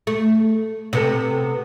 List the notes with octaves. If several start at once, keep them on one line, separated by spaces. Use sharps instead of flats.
A3
C3 B3 A4